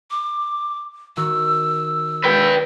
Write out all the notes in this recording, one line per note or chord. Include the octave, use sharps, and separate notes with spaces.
D6
D#3 F#4 E6
B4 G5